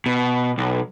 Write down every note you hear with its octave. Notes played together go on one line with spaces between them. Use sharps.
B2
B1